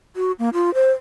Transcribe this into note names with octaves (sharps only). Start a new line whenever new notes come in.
F#4
A#3
F4
C5